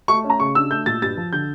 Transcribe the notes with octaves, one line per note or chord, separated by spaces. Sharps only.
A3 C#6
C#4
A#5
C#3 C#6
D4 E6
A3 G6
A#2 A6
G2 A6
F3
D3 G6